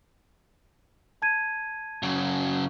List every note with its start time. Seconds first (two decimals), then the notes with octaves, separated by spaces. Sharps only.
1.22 A5 G#6 D#7
2.03 F#2 C#3